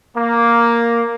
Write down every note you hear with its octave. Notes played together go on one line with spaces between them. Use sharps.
A#3